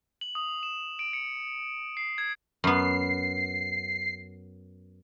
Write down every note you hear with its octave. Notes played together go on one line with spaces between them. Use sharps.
F#7
D#6
E7
D7
C#7
C7
G#6
F#2 B3 C7